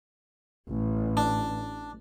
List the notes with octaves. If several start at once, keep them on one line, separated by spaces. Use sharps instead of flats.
A1
D4